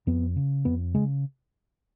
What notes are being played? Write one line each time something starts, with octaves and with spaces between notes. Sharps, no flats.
F2 B3
C#3
F2 B3
C#3 G#3